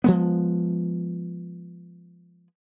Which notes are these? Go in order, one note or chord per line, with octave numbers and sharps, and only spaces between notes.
F3 G#3 B3